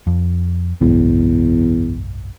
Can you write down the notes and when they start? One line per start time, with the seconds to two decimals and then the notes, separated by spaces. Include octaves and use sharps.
0.07 F2
0.81 F#1 B1 E2 G#2